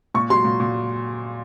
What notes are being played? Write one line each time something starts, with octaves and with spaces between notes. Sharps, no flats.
A#2 C#6
F#3 C6
A#2
A#2